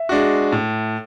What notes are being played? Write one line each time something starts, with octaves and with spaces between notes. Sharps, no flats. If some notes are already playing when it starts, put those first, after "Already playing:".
Already playing: E5
G#3 D4 F#4
A2